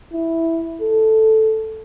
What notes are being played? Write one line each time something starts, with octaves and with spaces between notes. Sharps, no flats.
E4
A4